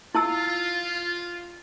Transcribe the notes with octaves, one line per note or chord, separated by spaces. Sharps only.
E4 F4 A5 E6